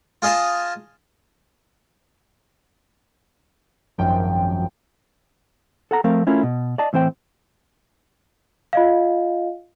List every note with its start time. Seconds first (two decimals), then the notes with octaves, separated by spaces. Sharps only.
0.22 F4 G#4 D#5 F5 A5
3.98 G#1 F#2 F3 G5
5.91 A4 F#5 A#5
6.04 F3 A3 C4 A#4 F5
6.27 A3 C#4 E4 F4 A#4
6.43 B2
6.78 D5 D#5 A5
6.93 A2 E3 C4 C5 G5
8.73 F4 D#5 F5